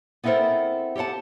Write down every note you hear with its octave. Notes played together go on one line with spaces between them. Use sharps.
B3 C4 E4 A4 A#4 C5
G4 A4 C#5 F#5 A5